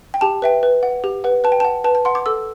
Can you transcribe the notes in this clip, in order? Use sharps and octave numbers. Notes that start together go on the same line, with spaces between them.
G5
G4 A5
B4 E5 G5
B4
F#5
G4
B4 F#5
B4 A5
G5
F#5 A5
B4 A5
A5
F#5 C6
D6
A4 E6